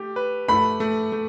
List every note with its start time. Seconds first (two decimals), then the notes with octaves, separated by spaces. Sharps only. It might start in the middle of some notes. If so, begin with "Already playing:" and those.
Already playing: A3 G4
0.16 B4
0.48 A3 B5
0.80 A3
1.12 A3